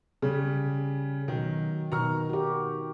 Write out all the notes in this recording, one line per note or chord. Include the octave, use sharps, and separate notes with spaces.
C#3 G3 C#4
B2 D#3 F#3
B2 D#3 A#5 C#6 F6
F#4 G4